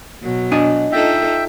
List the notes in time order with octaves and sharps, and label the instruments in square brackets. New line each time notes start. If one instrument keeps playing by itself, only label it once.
[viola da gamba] B2 F#3
[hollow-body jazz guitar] D4 D#5 G#5
[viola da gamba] D#4 F4 A4 [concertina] E5 G5